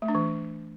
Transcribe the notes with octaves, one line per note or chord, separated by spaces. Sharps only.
A3
D4
E3